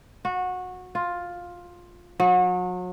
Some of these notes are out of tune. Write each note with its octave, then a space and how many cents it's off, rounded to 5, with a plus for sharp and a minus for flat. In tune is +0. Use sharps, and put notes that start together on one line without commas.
F#4 -20
F4 +10
F#3 -35